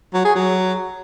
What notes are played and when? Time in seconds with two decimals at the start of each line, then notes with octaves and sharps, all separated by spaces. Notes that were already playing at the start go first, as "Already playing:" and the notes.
0.14 F#3
0.24 G#4
0.35 F#3